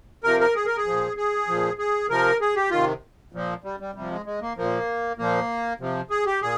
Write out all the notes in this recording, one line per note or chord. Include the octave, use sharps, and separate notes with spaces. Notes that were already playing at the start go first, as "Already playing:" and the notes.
C3 F3 A#4
A#4
G#4
A#4
G#4
A#2 F3
G#4
A#2 F3
G#4
C3 F3 A#4
G#4
G4
C3 D#3 F4
A#2 F3
G3
G3
C3 F3 G3
G#3
G#3
A#3
A#2 F3 A#3
A#2 F3 A#3
C3 F3
G#4
G4
A#2 G#4